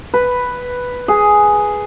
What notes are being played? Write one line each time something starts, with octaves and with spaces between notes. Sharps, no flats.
B4
G#4